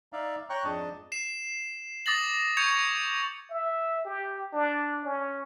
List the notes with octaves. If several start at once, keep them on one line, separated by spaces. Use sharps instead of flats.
D#4 D5 E5 F5
C#5 G5 A#5 C#6 F#6
F2 G#2 D4 D#5 A5
C7 E7
D6 D#6 A6 A#6 F#7
C#6 G6 G#6 C#7 F7
E5
G4
D4
C#4